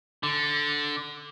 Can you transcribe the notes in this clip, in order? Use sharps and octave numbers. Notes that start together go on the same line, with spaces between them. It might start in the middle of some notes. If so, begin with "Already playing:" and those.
D3